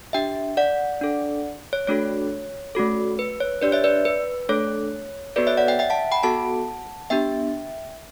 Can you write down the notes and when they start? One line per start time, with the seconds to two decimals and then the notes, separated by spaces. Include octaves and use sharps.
0.13 D4 G4 E5 G5
0.57 D5 F#5
1.01 D4 A4
1.73 C#5
1.87 A3 D4 F#4 A4 C#5
2.75 A3 C#4 F#4 A4
3.19 B4
3.40 C#5
3.62 D4 G4 B4 D5
3.72 C#5 E5
3.84 B4 D5
4.05 B4
4.49 A3 D4 A4 C#5
5.36 B3 F#4 A4 B4 D5
5.47 C#5 E5
5.57 D5 F#5
5.68 E5 G5
5.79 E5 G5
5.90 F#5 A5
6.12 G5 B5
6.23 B3 F#4 A4 F#5 A5
7.10 B3 D4 G4 E5 G5